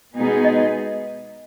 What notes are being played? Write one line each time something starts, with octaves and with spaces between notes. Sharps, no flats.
B2 G#3 B3 D#4 G#4
D#5